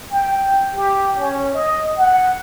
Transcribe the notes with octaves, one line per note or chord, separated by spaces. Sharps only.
G5
G4
C#4
D#5
F#5